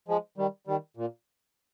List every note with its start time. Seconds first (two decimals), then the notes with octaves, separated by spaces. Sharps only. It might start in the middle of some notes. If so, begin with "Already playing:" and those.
0.08 F3 G#3
0.38 D#3 G3
0.67 D#3 G3
0.97 A#2